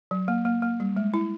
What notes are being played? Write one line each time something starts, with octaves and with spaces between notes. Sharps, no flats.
F#3
A#3
A#3
A#3
G3
G#3
E4